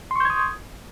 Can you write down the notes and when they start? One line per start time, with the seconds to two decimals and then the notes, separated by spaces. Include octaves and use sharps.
0.11 C6
0.16 C#6
0.20 G6
0.25 G#6
0.30 D#6